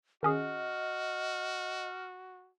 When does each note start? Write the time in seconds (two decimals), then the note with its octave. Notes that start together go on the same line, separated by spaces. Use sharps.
0.23 D#3 C#4 F#4 G#4 D#5 F6